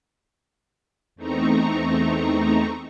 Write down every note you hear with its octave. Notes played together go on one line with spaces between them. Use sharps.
E2 A3 C4 D#4 A#5 C#6